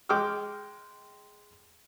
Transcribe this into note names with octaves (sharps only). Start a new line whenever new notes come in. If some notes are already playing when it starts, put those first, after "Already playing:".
G#3 G5 D6 D#6 F6